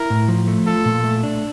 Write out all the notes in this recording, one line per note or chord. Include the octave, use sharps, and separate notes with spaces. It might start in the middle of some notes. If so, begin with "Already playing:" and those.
Already playing: E4 A#4
A2
F3
A3
F4 A4
A#2
A3
D4